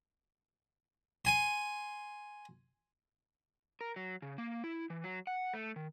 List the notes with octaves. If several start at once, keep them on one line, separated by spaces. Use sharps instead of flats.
G#5 C6
A#4
F#3
C#3
A#3
E4
E3
F#3
F#5
A3
D#3